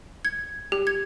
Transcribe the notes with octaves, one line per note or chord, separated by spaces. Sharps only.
G#6
G4
G#6